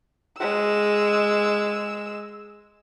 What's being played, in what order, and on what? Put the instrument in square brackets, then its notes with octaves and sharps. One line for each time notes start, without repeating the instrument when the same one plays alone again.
[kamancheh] G#3 E6